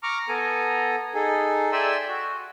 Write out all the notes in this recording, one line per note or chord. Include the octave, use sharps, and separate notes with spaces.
A#5 C#6 D6 F6
B3 A4 G#5 A#5
D#4 G#4 A4
D5 E5 G5 G#5 C6 E6
F#4